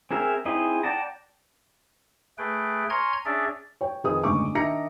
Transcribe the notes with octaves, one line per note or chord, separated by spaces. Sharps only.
C4 G#4 A#4 E5
C4 D#4 E4 G#4 D#5
D5 F#5 G5 A5 A#5
A3 G#4 B4 G5
C#5 G#5 A#5 C6 F6 G#6
C#4 D4 G#4 D5 E5
C#5 G5
F2 D#3 G#4 B4 D#6
F#1 D2 G#2 C#6 D6
D#3 D4 E5 A#5 A#6 C#7